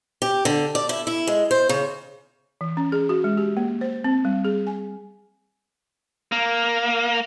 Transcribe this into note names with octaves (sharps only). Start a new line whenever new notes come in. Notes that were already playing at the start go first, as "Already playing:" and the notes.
G4
D3
D5
E4
E4
G#3
C5
C#3
E3
C#4
G#4
F#4
G#3
G4
A#3
C5
C4
G3
G#4
G#5
A#3